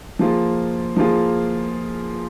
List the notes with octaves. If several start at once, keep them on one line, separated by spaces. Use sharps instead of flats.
F3 A#3 F4 G#4
F3 A#3 F4 G#4